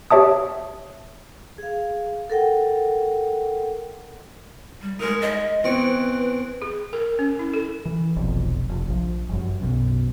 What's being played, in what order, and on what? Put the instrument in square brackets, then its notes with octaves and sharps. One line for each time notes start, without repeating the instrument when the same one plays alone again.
[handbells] G4 C#5 E5 A5 D#6
[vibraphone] G#4 F5
A4 A#4 F#5 G5
[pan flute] G3
[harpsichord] G#3 D#4 [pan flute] A#4
[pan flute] D#5
[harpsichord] E2 C4 C#6 [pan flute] B4
[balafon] G#4
A#4
C#4
E4
A4
[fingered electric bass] E3
F1 B1 F2
F1
A#1 F3
G1 F#2
B1 F#2 B2